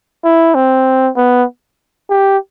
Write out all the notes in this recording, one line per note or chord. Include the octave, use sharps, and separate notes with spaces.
E4
C4
B3
G4